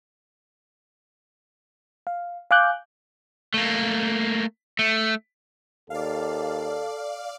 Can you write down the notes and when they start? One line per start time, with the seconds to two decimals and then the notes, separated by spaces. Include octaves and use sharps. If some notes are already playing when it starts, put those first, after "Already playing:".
2.07 F5
2.51 F5 G#5 D6 F#6 G6
3.54 A3 A#3
4.79 A3
5.90 D#2 A4 D5 F5